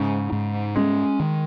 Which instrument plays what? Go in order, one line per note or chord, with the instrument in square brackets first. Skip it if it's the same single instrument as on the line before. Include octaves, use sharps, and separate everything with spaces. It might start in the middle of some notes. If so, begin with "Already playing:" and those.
Already playing: [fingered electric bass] G#2 [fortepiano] C#3
[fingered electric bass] G#2
[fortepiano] G#3 [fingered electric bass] C#4
[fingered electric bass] D#3